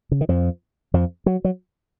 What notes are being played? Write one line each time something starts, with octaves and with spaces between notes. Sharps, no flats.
C#3
D#3
F2 F3
F2 F3
F#3
F#3